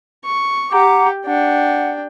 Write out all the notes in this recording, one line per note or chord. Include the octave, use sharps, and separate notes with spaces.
C#6
G4 F#5 G5 A#5 D6
D4 F#5 G5